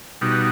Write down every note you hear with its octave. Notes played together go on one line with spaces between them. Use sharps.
B2 G3 D#4 F#4